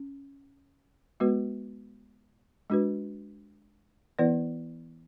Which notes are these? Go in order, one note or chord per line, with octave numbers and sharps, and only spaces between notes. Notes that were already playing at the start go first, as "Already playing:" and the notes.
Already playing: C#4
G#3 B3 F#4 B4
G#3 D4 F#4 B4
E3 B3 E4 B4 D5